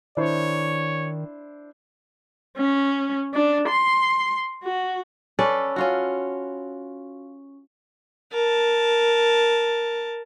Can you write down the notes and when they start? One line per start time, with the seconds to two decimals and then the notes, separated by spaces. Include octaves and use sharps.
0.17 D#3 D4 E4 C5 C#5
2.57 C#4
3.34 D4
3.68 C6
4.63 F#4
5.39 C#4 A4 B4 D5
5.76 C#4 F4 F#4
8.32 A#4 A5